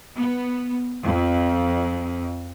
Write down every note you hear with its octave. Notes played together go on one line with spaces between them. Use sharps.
B3
F2